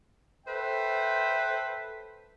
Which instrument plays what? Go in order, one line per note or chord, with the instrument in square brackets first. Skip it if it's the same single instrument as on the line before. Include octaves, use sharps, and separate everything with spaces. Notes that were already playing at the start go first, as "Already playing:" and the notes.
[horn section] A4 B4 C5 E5 G5